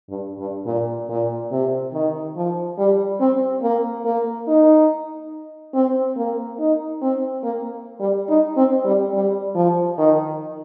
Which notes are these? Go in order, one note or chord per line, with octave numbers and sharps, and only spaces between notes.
G2
G2
A#2
A#2
C3
D#3
F3
G3
C4
A#3
A#3
D#4
C4
A#3
D#4
C4
A#3
G3
D#4
C4
G3
G3
F3
D#3